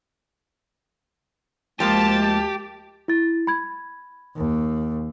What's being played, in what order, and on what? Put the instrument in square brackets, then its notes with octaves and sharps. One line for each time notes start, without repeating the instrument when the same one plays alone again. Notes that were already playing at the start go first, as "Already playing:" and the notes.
[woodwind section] D2 G#3 [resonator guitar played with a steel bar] F3 A#3 [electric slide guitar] G4 [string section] A5
[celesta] E4 A6
B5 G#6
[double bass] D#2